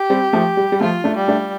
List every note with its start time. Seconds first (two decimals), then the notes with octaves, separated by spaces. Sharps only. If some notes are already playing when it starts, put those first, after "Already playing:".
Already playing: G4
0.10 G3 C4
0.33 F3 A3
0.57 G3
0.72 G3
0.81 F3 A3 F4
1.04 A3 D4
1.16 G3
1.28 A3 D4